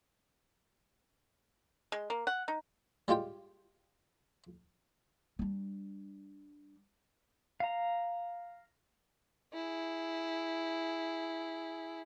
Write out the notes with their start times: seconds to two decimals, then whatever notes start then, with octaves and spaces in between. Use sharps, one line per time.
1.92 G#3
2.10 A#3
2.27 F#5
2.48 D#4
3.08 G3 G#3 F4 G4 G5
5.39 G3 D4
7.60 F5 A#5
9.54 E4 G#4